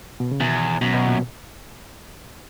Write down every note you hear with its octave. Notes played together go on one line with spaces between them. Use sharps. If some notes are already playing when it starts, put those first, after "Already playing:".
B2
C#3
E2 B2 D#3
F#2 B2
B2
A#2